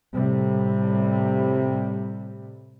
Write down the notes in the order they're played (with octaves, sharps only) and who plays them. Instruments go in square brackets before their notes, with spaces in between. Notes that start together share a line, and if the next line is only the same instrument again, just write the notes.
[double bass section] A2 C3 G3